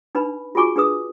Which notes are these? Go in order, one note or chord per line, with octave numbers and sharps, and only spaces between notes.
D4 D#4 B4 B5
F4 F#4 G#4 G#5 C#6 D6
D4 G#4 B4 D#6